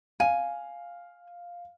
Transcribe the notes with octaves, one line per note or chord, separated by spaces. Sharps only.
F5 G#5